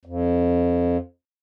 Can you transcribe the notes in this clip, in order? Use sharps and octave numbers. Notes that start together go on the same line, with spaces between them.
F2